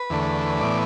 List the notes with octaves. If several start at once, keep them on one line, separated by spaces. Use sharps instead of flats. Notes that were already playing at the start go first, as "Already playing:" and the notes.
Already playing: B4
E2 D3 A3
A2 E3 B3 D5